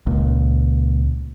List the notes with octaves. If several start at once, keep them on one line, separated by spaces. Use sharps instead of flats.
C#2 A#2